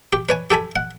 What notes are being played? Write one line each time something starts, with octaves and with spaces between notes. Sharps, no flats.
G4
B4 C#5 G#5
G4 A4 G#5 B5
F#5